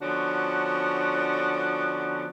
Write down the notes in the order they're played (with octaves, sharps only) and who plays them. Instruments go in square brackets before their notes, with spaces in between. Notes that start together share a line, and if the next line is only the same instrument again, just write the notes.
[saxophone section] D3 F3 B3 C#4 D4 F#4